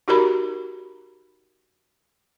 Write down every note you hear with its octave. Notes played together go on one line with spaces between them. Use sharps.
D#4 F#4 G4 A#4 A#5 B5